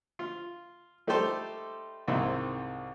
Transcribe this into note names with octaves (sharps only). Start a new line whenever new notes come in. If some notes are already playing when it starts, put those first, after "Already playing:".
F4
G3 A3 D#4 G4 A4 C5
C2 G#2 D#3 C4 E4